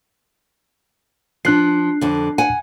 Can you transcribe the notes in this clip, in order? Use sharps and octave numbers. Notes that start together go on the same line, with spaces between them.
F3 D4 F#6 C7
F2 D3
F#5 G#5